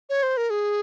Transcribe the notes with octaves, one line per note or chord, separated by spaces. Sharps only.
C#5
C5
A#4
G#4